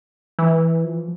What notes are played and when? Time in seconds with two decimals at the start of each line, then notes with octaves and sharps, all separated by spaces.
0.39 E3
0.84 F3